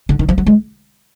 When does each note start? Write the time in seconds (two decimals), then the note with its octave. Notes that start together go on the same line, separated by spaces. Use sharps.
0.09 D3
0.19 D#3
0.29 F3
0.38 F#3
0.46 G#3